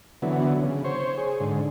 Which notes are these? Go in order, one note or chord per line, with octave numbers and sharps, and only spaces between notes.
D3 E3 F#3 B3
C#3
C5 C#5
G#4
G#2 D3